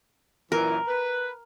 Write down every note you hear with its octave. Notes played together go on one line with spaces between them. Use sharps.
F#2 A#2 E3 A#4
B4